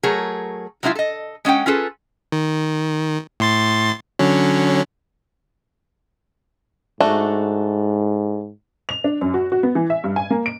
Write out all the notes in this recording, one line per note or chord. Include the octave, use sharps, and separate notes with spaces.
F#3 A3 G#4 A#4 C#5
F#3 G#3 C4 E4 F4 F5
A4 D#5
G#3 C#4 F#5 G5
C#4 F4 G#4 A4 B4
D#3
A2 C6 A6
D3 F#3 C#4
G#2 A3 D4 F#4
F7
D4
F#2
F#4
F#4
B3
E3
E5
G2
G#5
A#3
D7